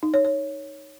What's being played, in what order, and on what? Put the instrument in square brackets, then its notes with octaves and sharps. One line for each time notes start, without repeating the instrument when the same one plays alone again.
[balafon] D#4
C#5
C#5